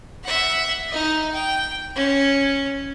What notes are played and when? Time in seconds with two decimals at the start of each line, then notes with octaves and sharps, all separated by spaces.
0.24 E5 F#5
0.90 D#4 D#5
1.32 G5
1.96 C#4